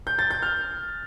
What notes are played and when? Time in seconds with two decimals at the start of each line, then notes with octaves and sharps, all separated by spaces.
0.07 G6
0.19 A6
0.31 G6
0.42 F6